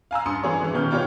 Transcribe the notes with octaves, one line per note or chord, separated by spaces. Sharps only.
F5 G#5 A#5 E6
G2 G#5 C6 D#6 C#7
E3 G#4 C#5
E3 C#4
B2 D#3 B4 F6 G6
B3 D#4 F4 G4 C#5